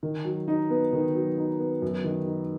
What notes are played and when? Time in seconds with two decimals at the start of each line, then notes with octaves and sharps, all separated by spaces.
0.03 D#3
0.25 F#3
0.48 D#4
0.70 B3
0.93 D#3
1.15 F#3
1.38 D#4
1.60 B3
1.82 F#2
2.04 D#3
2.27 D#4